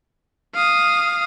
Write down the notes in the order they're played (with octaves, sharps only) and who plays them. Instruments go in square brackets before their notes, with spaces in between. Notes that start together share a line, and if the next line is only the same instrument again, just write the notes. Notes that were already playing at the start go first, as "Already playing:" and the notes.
[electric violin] F5 D#6